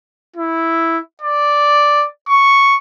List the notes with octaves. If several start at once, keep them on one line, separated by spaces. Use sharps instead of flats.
E4
D5
C#6